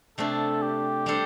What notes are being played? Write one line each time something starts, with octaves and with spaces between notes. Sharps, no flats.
C3 A3 D4 A4
G4
G3 D4 A4 C5